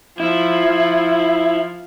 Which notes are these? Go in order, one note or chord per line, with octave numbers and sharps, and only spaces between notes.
F3 E4